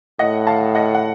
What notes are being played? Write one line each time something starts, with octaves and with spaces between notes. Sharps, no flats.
A2 D#5 F#5
F5 A5
D#5 F#5
F#5